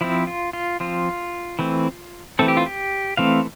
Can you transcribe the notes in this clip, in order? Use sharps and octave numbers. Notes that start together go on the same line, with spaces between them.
F3 C4 E4
F4
F4
F3 C4 F4
E3 A3 C4
E3 A3 C4 A4
G4
F4
G4
E3 A3 C4 F5